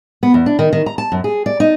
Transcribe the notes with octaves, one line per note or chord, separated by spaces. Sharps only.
B3
E2
D4
D#3
D#3
A#5
A5
F#2
G#4
D5
D#4